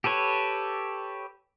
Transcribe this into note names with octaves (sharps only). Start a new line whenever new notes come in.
G4 A4 B4 C#5